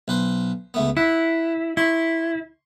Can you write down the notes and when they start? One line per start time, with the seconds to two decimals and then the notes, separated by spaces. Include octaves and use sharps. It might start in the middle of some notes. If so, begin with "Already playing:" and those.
0.08 B1 B4 C5
0.74 C#2 A3 B3
0.97 E4 F#5
1.77 E4 C6 C#6